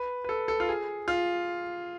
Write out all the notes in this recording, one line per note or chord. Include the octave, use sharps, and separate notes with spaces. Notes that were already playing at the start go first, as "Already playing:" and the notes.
Already playing: B4
B4
A4
A4
F4
G#4
F4